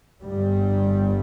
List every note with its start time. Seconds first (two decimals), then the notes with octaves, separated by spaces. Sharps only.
0.23 G1 G2 G3